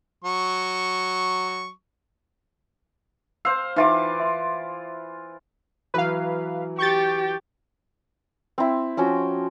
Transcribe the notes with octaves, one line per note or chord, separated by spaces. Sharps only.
F#3 C#6
C5 F5 E6
E3 D#4 F4 E5 C6 D6
E5 C6
E3 F#3 B4 F5
G4 C#6 G6 A6
C4 E4
F3 C#4 F#4 G5